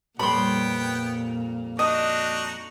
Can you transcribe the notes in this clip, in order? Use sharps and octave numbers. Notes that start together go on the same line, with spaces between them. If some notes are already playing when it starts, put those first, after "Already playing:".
F2 A#2 G3 B3 C#5 G5 B5 C6
D4 D#4 F#4 D#5